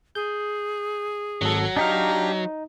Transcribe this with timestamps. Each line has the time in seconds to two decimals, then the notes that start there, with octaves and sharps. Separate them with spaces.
0.15 G#4 G6
1.41 G#1 F#3 A4
1.77 D4 D#4 G4 F5 A#5